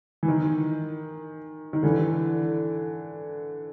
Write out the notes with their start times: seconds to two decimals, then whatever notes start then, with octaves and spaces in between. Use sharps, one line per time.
0.23 E3
0.28 D#3
1.73 D#3
1.83 D3 E3